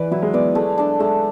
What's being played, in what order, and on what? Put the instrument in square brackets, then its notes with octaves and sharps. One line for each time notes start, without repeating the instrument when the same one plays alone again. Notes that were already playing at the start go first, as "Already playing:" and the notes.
Already playing: [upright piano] E3 [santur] G#4 B4 D5
[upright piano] F#3 [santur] E4
[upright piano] G#3
[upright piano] B3 [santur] B4 D5
[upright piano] G#3 [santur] A3
[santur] D4 A4
[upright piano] G#3 [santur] A3